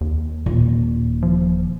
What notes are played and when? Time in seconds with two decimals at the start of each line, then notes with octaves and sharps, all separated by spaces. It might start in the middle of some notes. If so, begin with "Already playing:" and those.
0.01 D#2
0.46 D#1 A#2
1.23 F3